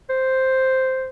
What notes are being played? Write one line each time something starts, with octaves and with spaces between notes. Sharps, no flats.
C5